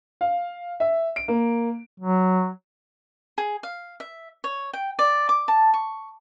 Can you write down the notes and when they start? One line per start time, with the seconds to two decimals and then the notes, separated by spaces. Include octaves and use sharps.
0.21 F5
0.80 E5
1.16 D7
1.28 A#3
2.00 F#3
3.38 G#4
3.63 F5
4.00 E5
4.44 C#5
4.73 G5
4.99 D5
5.29 D6
5.48 A5
5.74 C#6